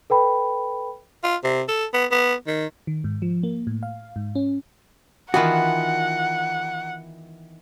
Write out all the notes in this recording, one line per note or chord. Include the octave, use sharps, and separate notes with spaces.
A4 B4 G5 B5
F4
C3
A4
B3
B3
D#3
D#3
G#2
F3
A#3
A2
F5
G#2
C#4
D#3 E3 B3 F4 F#4 F#5